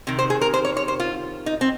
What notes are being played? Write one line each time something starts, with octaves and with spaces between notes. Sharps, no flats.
C3 D#3
C5
G#4
A#4
C5
C#5
C#5
C5
F4
D#4
C4